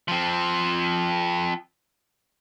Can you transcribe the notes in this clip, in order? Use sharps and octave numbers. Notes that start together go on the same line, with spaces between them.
F3 C4